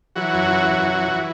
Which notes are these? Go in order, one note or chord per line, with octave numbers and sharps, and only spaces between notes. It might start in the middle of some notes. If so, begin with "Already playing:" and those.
E3 F#3 F#4
F#2
E3
F#2
E3
E3